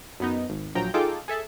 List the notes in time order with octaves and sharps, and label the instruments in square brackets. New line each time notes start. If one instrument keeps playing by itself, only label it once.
[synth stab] F#2 B3 D#4
G#1
A#1 F3 F#3 G5 A#5 G6
D#4 F4 G#4 A4 G5 D6
G#4 A4 E5 A5